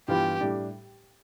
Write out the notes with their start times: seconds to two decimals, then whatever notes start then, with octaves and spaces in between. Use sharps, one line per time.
0.08 G2 E3 G3 B3 F4 G4
0.41 A2 G3 D4